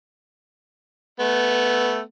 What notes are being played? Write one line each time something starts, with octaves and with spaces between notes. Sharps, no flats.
A3 B3